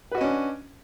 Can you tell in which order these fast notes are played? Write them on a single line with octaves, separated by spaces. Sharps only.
B4 F#4 D#5 C#4 D4